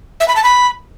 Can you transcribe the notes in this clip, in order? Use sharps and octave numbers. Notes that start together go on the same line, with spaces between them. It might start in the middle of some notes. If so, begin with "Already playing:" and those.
E5
B5
A5
B5